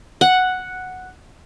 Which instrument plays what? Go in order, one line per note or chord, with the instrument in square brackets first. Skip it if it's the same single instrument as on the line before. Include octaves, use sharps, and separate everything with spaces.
[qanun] F#5